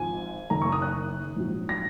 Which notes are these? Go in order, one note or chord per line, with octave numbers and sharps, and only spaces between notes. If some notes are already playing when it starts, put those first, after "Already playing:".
Already playing: G#1 G#2 F3 G#5
F#1 F#2 D#3 A#5
C#6
D#6
F#6
A#1 G#2 F#3
A#6